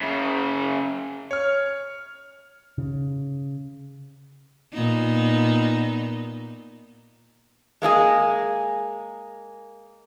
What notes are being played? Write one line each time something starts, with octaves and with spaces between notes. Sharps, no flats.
F#2 C#3
C#5 F6
C#3
A#2 B3 D#4
G#3 A#3 D4 G#4